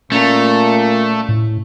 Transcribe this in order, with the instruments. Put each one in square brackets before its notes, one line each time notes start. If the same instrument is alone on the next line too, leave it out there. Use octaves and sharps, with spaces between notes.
[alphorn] A#2 [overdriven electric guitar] A3 [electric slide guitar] C#4 A#5
[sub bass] A2